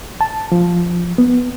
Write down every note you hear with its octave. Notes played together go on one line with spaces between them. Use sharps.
A5
F3
B3